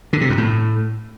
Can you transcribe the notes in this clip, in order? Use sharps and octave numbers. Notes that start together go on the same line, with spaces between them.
D3
C3
F#2
A2